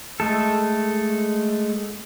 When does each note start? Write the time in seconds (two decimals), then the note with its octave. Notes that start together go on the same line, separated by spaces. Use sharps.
0.20 G#3 A3 A4